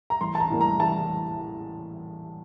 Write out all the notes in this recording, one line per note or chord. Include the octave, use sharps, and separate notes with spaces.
A#5
A1 C6
A5
A#5
A2 G3 A#3
A#5
A1 A5